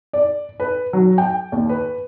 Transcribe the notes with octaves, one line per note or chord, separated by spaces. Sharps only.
D5
B4
F#3
G5
D#2
B4